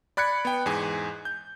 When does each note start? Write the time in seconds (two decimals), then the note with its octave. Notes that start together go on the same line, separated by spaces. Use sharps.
0.17 D5 B5 F#6 G#6 C#7
0.45 B3 G5
0.66 E2 G#2 G#4 G#5
1.25 G6